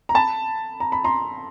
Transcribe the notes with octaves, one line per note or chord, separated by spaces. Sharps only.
A#5
A5 B5
A#5
B5
A#5 C6